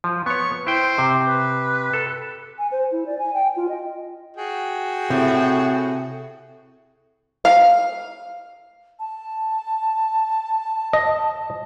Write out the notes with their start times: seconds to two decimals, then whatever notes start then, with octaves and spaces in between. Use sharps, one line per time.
0.04 F3
0.26 B3 C#5 C#6
0.67 E4 C5 G5
0.98 C3
1.27 B4
1.93 A4
2.58 G#5
2.72 C5
2.92 E4
3.06 D5
3.19 G#5
3.34 G5
3.56 F4
3.69 D#5
4.36 F#4 G#4 G5
5.10 A2 C3 A4
7.45 F5
8.99 A5
10.93 D#5